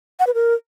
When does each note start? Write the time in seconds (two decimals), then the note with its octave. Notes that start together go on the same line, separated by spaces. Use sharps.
0.20 F#5
0.27 B4
0.34 A#4